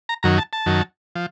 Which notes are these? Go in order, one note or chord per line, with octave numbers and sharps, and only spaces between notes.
A#5
F#2 D#3 F#3 A#5
A5
A5
F#2 D#3 F#3
F3